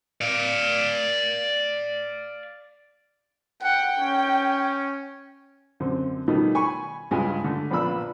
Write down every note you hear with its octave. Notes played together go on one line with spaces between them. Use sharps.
D5 F5
F#5 G5
C#4
F#2 D3 C4
B2 D#3 F3 G3 A3
G#5 B5 C#6
C#2 G2 G#3 F4 G#5
D3 A3
A#1 B3 F4 D5 B5 E6